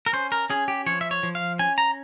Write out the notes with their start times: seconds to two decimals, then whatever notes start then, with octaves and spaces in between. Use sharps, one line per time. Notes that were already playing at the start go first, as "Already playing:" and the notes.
0.06 A#4
0.13 C#4 C5
0.32 A#4
0.50 C#4 G#4
0.68 G4
0.86 F3 C#5
1.01 E5
1.11 C#5
1.23 F3
1.35 F5
1.59 C#4 G#5
1.78 A#5